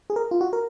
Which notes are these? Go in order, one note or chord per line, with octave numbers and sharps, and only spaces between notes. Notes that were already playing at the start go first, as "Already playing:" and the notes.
G#4
A#4
F4
F#4
A#4